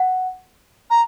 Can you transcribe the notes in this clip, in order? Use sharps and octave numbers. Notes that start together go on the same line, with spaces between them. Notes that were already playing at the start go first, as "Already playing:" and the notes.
Already playing: F#5
A#5